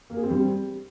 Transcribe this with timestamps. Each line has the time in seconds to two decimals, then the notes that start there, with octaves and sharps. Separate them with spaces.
0.10 A#3
0.17 G#4
0.23 C4
0.30 G3